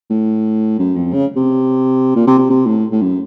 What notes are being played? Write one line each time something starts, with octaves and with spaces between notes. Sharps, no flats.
A2
F#2
F2
C#3
C3
A#2
C3
C3
C3
A2
A2
F#2